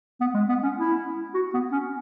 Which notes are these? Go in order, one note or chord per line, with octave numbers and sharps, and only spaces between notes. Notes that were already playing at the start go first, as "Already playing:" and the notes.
B3
G#3
B3
C#4
E4
F#4
B3
C#4